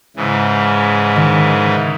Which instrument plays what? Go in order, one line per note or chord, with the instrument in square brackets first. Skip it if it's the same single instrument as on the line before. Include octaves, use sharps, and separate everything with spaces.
[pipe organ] G#2 C#3 E3
[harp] D#3